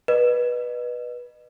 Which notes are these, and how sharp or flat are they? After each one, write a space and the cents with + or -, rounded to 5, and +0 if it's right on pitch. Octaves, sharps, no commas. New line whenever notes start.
B4 -15 D#5 -35